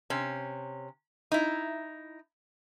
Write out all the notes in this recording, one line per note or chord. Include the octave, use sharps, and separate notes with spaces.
C3 C#4
D#4 E4